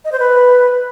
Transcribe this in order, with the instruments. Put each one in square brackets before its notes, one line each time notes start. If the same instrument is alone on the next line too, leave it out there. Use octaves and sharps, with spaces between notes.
[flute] D#5
C5
B4